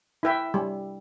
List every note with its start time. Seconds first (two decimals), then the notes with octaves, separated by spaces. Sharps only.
0.23 E4 B4 E5 G5
0.54 G3